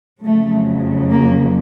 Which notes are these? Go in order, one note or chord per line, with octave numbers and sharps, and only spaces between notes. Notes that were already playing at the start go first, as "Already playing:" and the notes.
F2 C#3 F#3 A3
A#3